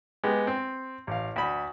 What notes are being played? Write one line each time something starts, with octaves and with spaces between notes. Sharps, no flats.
G#3 B3 G4
C4
A1 F5
D2 B5